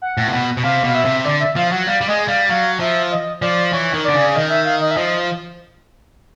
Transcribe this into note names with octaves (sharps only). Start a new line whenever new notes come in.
F#5
A2
C3
B2
B2
C3 F5
B2 F5
E5
C3
D3 D5
E5
F3 F5
F#3 F#5
G3 F5
G3
G#3 D#5
G3 F5
F#3 F5
F3 E5
D#5
F3 D5
E3 C#5
D#3
D3 D5
C#3
D#3 D#5
E5
F5
D#5
E5
F3 D#5